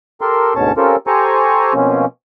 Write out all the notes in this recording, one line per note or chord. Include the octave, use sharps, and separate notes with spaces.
G4 A4 A#4 C6
D2 G#2 B2 C#4 C#5 A5
C4 C#4 F4 G4 A4 A#4
G4 A4 C5 G#5 A#5 C#6
B2 F3 A#3 C4 C#4